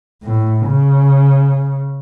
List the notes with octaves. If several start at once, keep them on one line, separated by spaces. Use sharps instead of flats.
A2
C#3